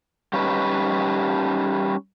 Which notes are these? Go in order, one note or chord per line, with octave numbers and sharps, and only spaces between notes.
G3 C#4 D#4 B4